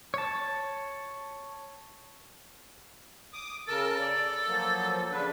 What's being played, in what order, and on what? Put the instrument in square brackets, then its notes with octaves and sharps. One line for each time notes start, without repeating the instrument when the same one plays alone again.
[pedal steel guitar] C#5 A5
[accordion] D6 D#6
[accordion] C#3 A#4 A5 [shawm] A4
[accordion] D5
F3 F#3 A#3
C#3 D4 B4